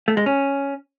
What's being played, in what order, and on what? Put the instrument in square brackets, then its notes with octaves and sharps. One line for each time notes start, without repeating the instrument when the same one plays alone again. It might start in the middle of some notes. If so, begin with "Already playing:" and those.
[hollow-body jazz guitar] A3
G#3
C#4